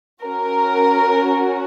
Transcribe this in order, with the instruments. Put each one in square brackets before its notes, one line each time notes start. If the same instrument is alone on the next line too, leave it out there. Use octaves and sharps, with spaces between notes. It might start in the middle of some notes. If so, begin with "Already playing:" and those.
[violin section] C#4 F#4 A#4